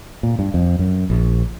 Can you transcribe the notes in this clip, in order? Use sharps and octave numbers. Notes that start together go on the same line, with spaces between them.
A#2
G2
F2
F#2
A#1